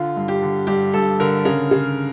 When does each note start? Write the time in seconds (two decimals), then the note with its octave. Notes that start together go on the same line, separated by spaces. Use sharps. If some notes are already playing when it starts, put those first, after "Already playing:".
Already playing: D3 F4
0.16 G2
0.28 G4
0.42 D3
0.67 G2 G4
0.94 G2 A4
1.20 D3 A#4
1.45 C#3 A#4
1.71 C#3